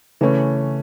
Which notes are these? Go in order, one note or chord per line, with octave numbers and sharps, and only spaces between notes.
C#3 E3 A3 C#4